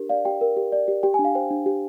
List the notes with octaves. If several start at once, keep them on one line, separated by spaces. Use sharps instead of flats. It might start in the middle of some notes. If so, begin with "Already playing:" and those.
Already playing: D4 G4 A#4
D5 F5
G4 G5
A#4
G4
D5
G4
G4 G5
G#5
D4
F5
C5 G5
D4
G4